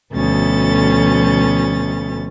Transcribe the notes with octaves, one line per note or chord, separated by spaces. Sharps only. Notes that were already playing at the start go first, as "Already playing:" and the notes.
D2 B2 F3 C#4 A4 A6